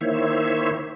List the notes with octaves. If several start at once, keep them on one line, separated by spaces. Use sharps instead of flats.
D#3 A#3 E4 C5 C#5 E5